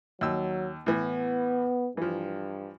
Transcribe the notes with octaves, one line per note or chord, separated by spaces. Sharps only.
D#2 F#3 E6
A2 E3 B3
G2 E3 F3